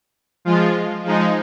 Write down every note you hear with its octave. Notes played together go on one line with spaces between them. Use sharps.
F3 G#3 F4
F3 G#3 D#4